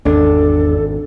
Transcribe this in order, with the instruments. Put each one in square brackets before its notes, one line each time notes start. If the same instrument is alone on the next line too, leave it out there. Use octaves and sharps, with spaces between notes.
[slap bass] G#1 [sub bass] E2 [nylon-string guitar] D4 [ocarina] A4